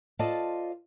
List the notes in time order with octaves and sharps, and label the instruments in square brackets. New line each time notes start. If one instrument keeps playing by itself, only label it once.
[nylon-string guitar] F4 A4 C5 D5 D#5 A5